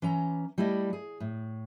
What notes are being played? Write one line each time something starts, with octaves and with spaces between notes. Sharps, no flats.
E3 C#4 A#5
G3 A3 E4 D5 D#5
G#4
A2